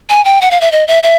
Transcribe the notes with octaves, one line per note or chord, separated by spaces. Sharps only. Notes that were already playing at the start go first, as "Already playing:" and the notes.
G#5
G5
F#5
F5
E5
D#5
E5
E5